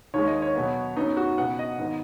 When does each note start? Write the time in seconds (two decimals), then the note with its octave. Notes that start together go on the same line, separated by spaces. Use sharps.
0.14 D#2 D#3 G#3 C#5
0.27 D#5
0.42 C#5
0.55 B2 F#3 B3
0.96 F#2 F#3 B3 D#4
1.17 F#4
1.37 C#2 B2 B3 F#5
1.59 D#5
1.78 G#2 D#3 B3